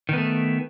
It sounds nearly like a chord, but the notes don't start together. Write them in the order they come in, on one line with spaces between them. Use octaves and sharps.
D#3 B3 A3